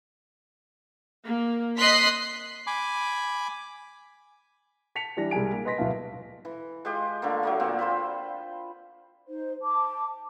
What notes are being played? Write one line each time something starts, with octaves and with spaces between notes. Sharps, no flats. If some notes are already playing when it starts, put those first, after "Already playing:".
A#3
D#5 C6 F#6 B6 C7
G#5 B5 D6
A5 B6 C#7 F7
E3 G3 D4 A#6
C2 G3 G#3 G#5 D7
A#3
B4 D#5 C6 A#6 B6
D1 B2 B3 E4 F5 A5
E3
G#3 F4 G4 D#5
D3 A3 A#3
F#3 A3 A#3
A#2 A#3 C4
F4 C5 G5 B5
D#4 C5
A5 D6